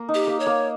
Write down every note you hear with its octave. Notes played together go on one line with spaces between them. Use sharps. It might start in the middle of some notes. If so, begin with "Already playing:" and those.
Already playing: A#3 A#4
D#4
G4
A#3
C#5
A#3